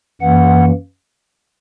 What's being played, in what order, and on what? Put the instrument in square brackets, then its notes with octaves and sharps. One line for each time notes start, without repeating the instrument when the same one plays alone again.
[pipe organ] F#2 E3 A#3 F#5